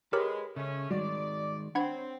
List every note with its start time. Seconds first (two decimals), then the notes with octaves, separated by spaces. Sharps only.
0.13 G#3 G4 A#4 B4 C#5 B5
0.56 C#3 G#3 A3 C#4
0.90 D#3 G3 G#3 F#4 D5
1.75 C4 D4 C#5 F#5 B5 G#6